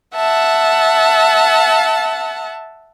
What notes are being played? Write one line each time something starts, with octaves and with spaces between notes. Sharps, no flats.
E5 F#5 A5